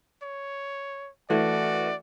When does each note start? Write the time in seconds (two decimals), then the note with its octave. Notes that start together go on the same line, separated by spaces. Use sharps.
0.23 C#5
1.30 E3 A3 F#4 D5